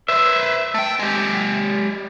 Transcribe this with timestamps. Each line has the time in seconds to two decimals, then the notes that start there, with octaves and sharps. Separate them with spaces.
0.08 B4 C5 E5
0.74 A3 G5
0.99 G#3 G4